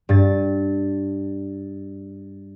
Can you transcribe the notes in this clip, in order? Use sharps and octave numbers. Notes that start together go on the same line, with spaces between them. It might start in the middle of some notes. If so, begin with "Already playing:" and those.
G2 A6